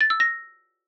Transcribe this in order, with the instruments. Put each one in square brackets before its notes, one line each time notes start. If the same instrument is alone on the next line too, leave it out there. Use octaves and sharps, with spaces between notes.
[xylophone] A6
E6
A#6